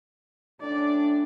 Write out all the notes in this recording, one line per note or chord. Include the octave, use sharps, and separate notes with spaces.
A2 C#4 D4 D5